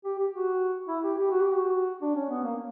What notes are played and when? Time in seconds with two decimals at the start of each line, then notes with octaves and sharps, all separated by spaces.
0.05 G4
0.18 G4
0.33 F#4
0.88 E4
1.04 G4
1.17 G4
1.31 F#4
1.42 G4
1.53 F#4
2.02 D4
2.16 C#4
2.30 B3
2.43 A#3